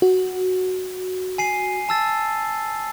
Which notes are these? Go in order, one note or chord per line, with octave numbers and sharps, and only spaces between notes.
F#4
G#5 C7 D#7
A5 E6 A6